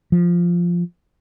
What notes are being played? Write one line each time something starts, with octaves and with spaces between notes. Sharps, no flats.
F3